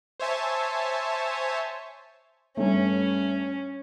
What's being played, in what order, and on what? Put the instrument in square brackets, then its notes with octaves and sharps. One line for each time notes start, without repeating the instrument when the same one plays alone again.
[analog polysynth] C5 C#5 E5 G#5 A5
[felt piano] G2 A3 [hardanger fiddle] C#4